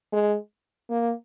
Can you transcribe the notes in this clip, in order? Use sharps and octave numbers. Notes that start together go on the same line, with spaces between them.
G#3
A#3